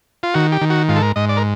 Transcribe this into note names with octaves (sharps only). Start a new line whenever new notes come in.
F4
D#3 F#4
G4
D#3
F#4
G#2 F4
A4
A#4
G#2 D#5
D5
A#4